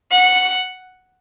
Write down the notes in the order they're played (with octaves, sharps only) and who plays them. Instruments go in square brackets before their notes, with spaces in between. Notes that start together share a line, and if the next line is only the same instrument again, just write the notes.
[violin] F#5